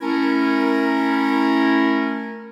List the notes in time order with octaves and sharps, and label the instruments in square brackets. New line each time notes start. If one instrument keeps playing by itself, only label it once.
[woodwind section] A3 C#4 E4 A#4